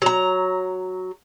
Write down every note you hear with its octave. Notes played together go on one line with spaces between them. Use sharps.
F#3 A#5